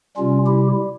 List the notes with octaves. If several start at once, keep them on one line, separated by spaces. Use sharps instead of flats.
C3 G3 C#4 F4
E4 G4